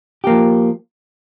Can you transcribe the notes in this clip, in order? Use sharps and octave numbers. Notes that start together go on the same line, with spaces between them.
F3 A#3 G4